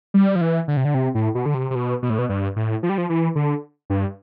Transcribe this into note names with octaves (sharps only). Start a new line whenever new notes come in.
G3
F3
E3
D3
C3
D3
C3
A2
B2
D3
C3
C3
B2
B2
A2
B2
G2
A2
F3
G3
F3
E3
D3
G2